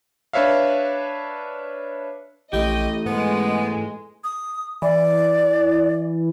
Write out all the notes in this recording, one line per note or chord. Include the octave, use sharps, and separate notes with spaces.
D4 B4 C#5 E5 F5
A#1 E3 A3 G4 D#5
G#2 G#3 B3
D#6
E3 D5